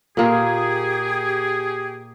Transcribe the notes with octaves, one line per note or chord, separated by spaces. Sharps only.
A#2 A#3 G4 G#4